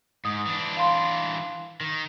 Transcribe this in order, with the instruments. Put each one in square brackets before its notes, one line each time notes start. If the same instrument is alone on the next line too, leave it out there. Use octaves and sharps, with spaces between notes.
[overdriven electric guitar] G#2 [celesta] D#6
[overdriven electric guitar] E3 D4
[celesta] F5 C6
[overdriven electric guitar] D#3